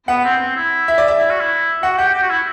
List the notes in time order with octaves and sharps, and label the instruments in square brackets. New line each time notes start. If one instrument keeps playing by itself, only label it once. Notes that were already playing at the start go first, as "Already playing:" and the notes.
[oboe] B3 [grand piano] F#5
[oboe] C4
C4
E4
[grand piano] E5
D5
E5
[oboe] E4
F#4
E4
[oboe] F#4 [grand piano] F#5
[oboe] G4 [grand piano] F#5
[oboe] G4
F#4
E4